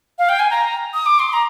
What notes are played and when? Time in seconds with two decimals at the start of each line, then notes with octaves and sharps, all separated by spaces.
0.18 F5
0.29 G5
0.39 G#5
0.50 A#5
0.94 D#6
1.06 D6
1.19 C6
1.33 A#5